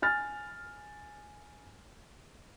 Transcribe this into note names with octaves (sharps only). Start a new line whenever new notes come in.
G#5 F6 A6